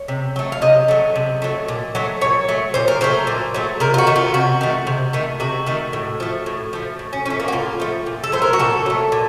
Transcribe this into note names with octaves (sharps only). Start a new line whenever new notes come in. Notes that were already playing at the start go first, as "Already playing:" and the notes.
Already playing: C#5
C3
F#3 A3
F5
C3 D#5
F#3 A3
C3
F#3 A3
A#2
F#3 A3
A#2 C#5
F#3 A3
A#2 C5
A#4
F#3 A3 C5
A#2
F#3 A3
C3 A#4
F4
F#4
D#3 A3
F4
C3 F#4
D#3 A3
C3
D#3 A3
C3 F#4
D#3 A3
A2
F3 A3
A2
F3 A3
A2
C#4
F3 A3 C#4
A#3
F#4
A2 F4
F3 A3
A#2
A4
F#3 A3 C5
A#4
F#4
A#2 A4
F#3 A3
A#2